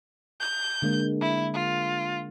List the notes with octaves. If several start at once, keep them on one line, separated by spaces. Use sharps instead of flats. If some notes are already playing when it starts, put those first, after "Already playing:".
G6
D3 G#3 A#3
E4
F4